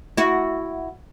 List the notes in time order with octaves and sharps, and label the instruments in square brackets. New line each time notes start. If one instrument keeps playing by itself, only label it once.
[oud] E4 F#4